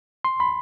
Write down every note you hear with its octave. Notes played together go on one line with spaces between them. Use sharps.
C6
B5